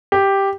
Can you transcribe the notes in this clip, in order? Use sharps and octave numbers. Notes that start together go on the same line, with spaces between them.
G4